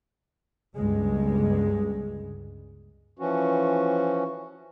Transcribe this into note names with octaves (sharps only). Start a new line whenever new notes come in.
G1 C#2 G2 G#3
E3 F3 C#4 F#4